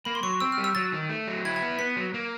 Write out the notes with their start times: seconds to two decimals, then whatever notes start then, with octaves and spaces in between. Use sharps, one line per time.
0.05 A#3 B5
0.15 C6
0.23 F#3 C#6
0.40 C4 E6
0.52 F6
0.58 G3
0.64 E6
0.75 F#3 A6
0.92 D#3
1.10 A3
1.27 F#3
1.45 E4 G#6
1.56 G#6
1.62 B3
1.79 B3 B6
1.96 F#3
2.14 A#3